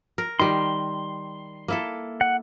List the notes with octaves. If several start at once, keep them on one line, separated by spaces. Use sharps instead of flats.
A#4
D#3 G3 C6
A#3 E4 A4
F#5